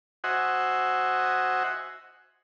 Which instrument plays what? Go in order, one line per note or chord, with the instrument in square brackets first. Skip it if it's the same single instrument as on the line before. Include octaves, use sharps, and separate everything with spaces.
[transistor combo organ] F#4 C5 D#5 E5 F#5 G#5